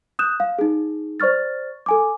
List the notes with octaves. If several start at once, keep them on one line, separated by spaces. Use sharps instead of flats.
D#6 F#6 G6 E7
F5
D#4 G#4
C5 D5 C#6 F6 A6
A4 G#5 D6